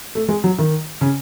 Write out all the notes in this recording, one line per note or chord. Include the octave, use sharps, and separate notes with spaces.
A3
G#3
F#3
D#3
C#3